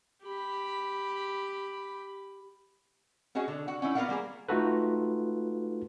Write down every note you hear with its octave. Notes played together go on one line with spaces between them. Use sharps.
G4 B5
C#4 F#4 G#4 D#5
D3
F#4 F#5
C#4 D#4 E4
B3 F4 A#4 D5 F5 F#5
G3 A#3 G#4 A#4
A3 D#4 F4 F#4 A4 B4